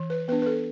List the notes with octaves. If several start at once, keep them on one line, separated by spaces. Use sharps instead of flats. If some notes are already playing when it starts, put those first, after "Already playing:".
Already playing: E3
B4
B3 D4 B4
B4
A4